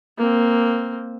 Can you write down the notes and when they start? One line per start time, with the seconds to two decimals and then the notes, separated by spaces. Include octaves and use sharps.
0.18 A#3 C4